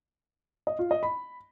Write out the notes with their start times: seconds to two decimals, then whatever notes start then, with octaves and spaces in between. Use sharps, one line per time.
0.67 D#5
0.79 F4
0.91 D#5
1.03 B5